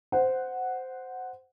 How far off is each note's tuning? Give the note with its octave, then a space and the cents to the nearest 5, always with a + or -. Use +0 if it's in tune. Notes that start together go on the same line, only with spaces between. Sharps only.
C5 -10 F#5 +0